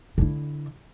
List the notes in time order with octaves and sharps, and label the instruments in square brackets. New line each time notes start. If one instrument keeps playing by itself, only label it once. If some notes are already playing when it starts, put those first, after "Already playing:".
[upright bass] D3 E4